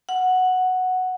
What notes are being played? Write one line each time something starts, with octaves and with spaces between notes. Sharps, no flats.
F#5